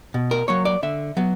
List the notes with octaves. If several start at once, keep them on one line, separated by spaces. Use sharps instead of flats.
B2
A#4
F#3 A#3 C#5
D5
D3 E5
F#3 B3